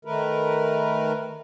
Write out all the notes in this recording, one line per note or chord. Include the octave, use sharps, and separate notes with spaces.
D#3 A3 A#4 B4